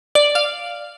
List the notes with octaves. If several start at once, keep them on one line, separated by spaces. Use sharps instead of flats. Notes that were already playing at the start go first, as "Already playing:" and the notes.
D5
F5